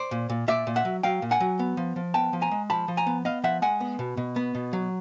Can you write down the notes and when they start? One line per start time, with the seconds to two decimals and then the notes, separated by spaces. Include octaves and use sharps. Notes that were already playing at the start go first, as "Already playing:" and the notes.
Already playing: C5 D5
0.11 A#2
0.30 A#2
0.48 A#2 D5 E5
0.67 A#2
0.76 E5 F#5
0.85 F#3
1.03 F#3 F5 G5
1.22 A#2
1.31 F#5 G#5
1.40 F#3
1.59 B3
1.77 F3
1.96 F3
2.14 B3 G5 A5
2.33 F3
2.42 G#5 A#5
2.51 G#3
2.70 F3 A5 B5
2.88 F3
2.97 G#5 A#5
3.06 B3
3.25 B3 D#5 F5
3.44 F3 E5 F#5
3.62 G#3 F#5 G#5
3.80 B3
3.99 B2
4.17 B2
4.36 B3
4.55 B2
4.73 F#3